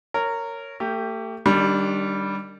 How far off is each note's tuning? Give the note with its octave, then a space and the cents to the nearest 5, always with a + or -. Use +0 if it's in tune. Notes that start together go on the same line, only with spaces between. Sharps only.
A#4 -15 C#5 +0
A3 +35 G4 +0
D#3 -35 G3 +0 D4 -20